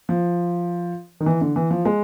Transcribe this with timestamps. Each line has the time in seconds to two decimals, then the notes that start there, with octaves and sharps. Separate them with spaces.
0.09 F3
1.20 D#3
1.26 E3
1.41 D3
1.56 E3
1.71 F3
1.85 G#3